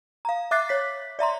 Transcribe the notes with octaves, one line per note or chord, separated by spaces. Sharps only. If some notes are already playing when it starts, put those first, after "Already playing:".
F5 A#5
E5 D6 F#6 A6 C7
C#5 B6
D5 E5 A#5 C6